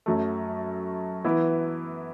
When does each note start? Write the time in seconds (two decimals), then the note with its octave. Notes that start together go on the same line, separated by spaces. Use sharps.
0.06 F#2 F#3 A3
1.24 E3 B3 E4